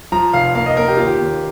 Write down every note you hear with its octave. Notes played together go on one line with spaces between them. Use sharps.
F3 A#5
F1 F5
A#3 F5
D#5
A#3 A#4
G4
D#2 F4
G4
D#2